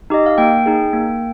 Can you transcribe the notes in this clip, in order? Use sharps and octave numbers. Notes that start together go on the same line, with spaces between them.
D#4 G4 D#5
F5
A#3 G5
D#4 G#4
A#3